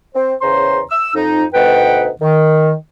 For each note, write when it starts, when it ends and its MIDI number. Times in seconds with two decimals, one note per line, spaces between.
0.15 0.34 60
0.15 0.34 72
0.42 0.81 40
0.42 0.81 49
0.42 0.81 61
0.42 0.81 72
0.42 0.81 82
0.42 0.81 84
0.91 1.11 88
1.15 1.45 41
1.15 1.45 63
1.54 2.08 38
1.54 2.08 47
1.54 2.08 63
1.54 2.08 71
1.54 2.08 78
1.54 2.08 79
2.21 2.73 51